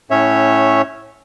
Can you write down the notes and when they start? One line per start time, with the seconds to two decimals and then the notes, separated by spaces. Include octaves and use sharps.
0.10 A2 C#4 C#5 E5